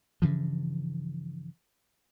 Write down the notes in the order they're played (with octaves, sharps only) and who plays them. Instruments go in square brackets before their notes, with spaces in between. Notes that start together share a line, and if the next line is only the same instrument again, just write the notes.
[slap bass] G2 C#3 E3 F3